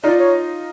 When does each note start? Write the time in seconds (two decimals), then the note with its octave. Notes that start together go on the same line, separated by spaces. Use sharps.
0.04 D#4 F4 D5
0.19 C#5